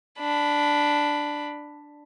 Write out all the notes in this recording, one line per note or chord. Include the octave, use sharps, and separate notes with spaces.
D4 B5